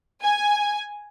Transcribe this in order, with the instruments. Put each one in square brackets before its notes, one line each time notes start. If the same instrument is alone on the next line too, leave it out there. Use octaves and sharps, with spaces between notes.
[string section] G#5